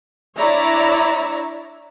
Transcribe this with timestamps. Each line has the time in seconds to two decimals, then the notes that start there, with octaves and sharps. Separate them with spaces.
0.37 D4 E4 C#5 D5 E5 A#5